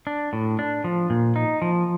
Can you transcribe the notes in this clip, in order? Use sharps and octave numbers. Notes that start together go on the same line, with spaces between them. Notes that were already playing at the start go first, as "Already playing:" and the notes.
D4
A2
D4
F3
A#2
D#4
F3